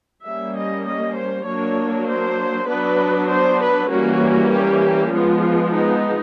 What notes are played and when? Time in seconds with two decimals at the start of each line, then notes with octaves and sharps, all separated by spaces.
0.24 G3 A#3 C#4 E5
0.55 D#5
0.85 D#5
1.16 C5
1.45 F#3 A#3 D4 C#5
2.07 C5
2.68 F#3 B3 D4 B4
3.29 C5
3.60 B4
3.90 E3 G3 A#3 C#4 F#4
4.51 G4
5.12 F3 G#3 B3 F4
5.73 D#4